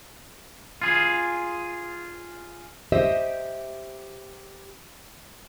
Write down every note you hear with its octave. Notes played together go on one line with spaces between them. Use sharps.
F4 G#4
G4 C5 D#5 E5